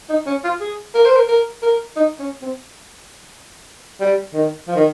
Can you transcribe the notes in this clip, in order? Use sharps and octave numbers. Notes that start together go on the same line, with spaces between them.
D#4
C#4
F4
G#4
A#4
C5
A#4
A#4
A#4
D#4
C#4
C4
G3
D#3
F3
D#3